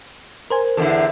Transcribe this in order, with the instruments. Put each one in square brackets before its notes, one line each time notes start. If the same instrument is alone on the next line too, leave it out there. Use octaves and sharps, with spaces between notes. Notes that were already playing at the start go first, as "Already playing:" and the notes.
[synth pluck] A#4 C5 G#5
[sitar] E2 D3 E4 [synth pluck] A4